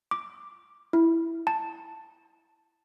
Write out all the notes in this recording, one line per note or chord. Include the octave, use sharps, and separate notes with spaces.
D6
E4
A5